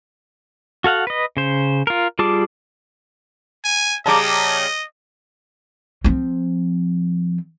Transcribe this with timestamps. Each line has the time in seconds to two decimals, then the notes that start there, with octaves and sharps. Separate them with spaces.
0.84 F#4 A4 F5 F#5
1.07 B4 D#5
1.37 C#3 C5
1.87 F4 A#4
2.19 G3 F4 G#4 A5 D6
3.64 G#5
4.06 C#3 G3 D#5 A5 A#5 D6
6.04 F3 C4